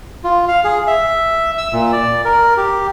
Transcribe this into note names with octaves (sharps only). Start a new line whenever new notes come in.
F4
F5
G#4
E5
E6
A#2
D5
A#4
G4